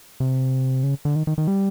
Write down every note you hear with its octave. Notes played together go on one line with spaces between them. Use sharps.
C3
C#3
D3
D#3
D#3
D#3
G3